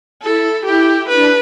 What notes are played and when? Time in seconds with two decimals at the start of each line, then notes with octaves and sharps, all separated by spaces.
0.22 E4 A4
0.65 E4 G4
1.08 D4 B4